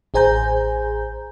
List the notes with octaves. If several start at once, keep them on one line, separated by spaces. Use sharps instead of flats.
A1 G#4 C5 G#5 A#5 G6